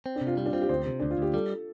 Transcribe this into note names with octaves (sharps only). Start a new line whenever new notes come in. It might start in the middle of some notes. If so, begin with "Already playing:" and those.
C4
D4
C3
F4
G3 F4
D4
C4 F4
G4
D2 C5
C3
D2 D4
F4
D2 G4
G3 A4